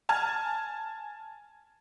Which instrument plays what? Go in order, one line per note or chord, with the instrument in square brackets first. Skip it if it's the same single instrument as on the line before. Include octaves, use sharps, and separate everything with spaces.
[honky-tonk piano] G#5 A5 F6 G#6